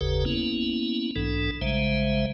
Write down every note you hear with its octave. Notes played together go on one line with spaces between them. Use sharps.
F#1 D#2 C#3 G4 A4 B4
A#3 B3 C#4 E4
B1 G#2 E3 D4 A4
A#1 C#3 G3 G#3 C5 E5